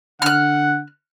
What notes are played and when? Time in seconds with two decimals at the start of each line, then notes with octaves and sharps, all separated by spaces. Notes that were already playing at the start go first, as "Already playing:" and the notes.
0.22 D3 F#5 F6 F#6